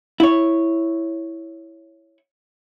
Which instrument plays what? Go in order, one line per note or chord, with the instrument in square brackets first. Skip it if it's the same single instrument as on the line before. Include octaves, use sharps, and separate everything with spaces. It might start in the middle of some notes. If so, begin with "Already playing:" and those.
[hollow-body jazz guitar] E4 C#5